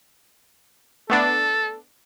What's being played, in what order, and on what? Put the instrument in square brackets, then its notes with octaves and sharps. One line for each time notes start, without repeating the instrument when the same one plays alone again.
[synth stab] A3 B3 D4 [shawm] A4